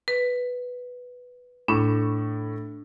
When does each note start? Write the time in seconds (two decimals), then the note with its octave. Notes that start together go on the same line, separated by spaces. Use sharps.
0.08 B4
1.68 A2 D4 B5 C#6